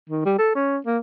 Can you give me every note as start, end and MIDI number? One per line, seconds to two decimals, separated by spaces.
0.10 0.25 51
0.25 0.34 55
0.38 0.54 69
0.55 0.78 61
0.86 0.98 58